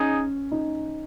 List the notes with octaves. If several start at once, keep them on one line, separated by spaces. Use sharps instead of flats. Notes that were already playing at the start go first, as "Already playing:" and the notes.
Already playing: C#4 D#4 G#4
D#4